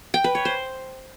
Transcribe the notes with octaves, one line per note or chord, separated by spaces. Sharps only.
G5
B4
C#5
C5